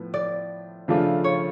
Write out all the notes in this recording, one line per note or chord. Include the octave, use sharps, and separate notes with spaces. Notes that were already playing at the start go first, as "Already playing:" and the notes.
Already playing: A2 F3 B3
D5
C#3 F3 A3 D4 F4
C#5